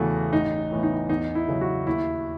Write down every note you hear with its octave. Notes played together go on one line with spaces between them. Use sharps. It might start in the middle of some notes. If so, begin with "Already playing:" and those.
Already playing: E2 C#3 E3 A3 F#4
A1 D#4
A2 E3 B3
D#4
E2 D#4
E4
C#3 F#3
F#4
D#2 E4